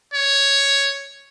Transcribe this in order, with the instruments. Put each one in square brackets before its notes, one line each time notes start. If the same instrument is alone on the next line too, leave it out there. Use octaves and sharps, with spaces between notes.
[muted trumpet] C#5